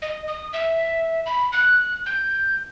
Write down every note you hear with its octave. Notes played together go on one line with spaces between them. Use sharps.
D#5
D#6
E5
B5
F#6
G6